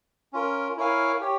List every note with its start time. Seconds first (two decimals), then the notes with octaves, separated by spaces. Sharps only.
0.33 C#4 F4 A#4
0.77 E4 A#4 C#5 F5 G#5
1.21 G4 C#5